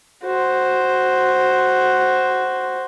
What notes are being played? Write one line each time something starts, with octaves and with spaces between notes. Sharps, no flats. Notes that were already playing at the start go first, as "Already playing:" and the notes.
F#4 C5